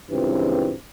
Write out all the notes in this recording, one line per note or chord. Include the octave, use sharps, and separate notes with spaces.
C#2 G2 A#2 E3 C4